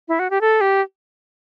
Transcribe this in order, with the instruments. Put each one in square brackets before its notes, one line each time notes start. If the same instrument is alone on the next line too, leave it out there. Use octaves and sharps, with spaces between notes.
[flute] E4
F#4
G4
A4
G4